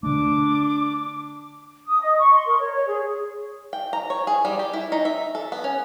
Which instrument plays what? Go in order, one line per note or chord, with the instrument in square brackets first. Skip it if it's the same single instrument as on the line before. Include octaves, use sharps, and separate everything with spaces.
[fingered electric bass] D3 A3 [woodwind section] D4 [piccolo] D6
[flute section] D#6
D#5
C#6
C6
A#4
C#5
C#5
G#4
[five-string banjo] G5
A#5
C#5
G#4
G3
G4
E4
D#4
E5
A4
B3
C#4